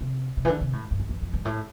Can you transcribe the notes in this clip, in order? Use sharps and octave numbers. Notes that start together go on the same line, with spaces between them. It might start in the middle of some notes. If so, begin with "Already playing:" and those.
C3
C3
E3
D3
C3
A2
G2
F2
E2
F2
G2
A2